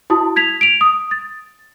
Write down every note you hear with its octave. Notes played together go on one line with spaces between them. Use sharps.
E4 F#4 A5 D#6
G#6 B6 F7
D7 F7
D#6
A6